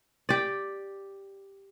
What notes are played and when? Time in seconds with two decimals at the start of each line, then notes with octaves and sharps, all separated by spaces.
0.29 G4 D5